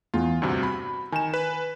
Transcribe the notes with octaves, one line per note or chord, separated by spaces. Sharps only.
E2 F4
D2 G2 C3 F#4
B5
D#3 G#5 E7
B4